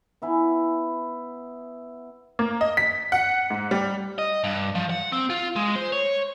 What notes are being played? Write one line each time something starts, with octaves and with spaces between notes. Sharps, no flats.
B3 E4 G#5
A#3
D#5
B6
F#5
G#2
G3
D#5
G2
F3
F#5
C4
F4
G#3
C5
C#5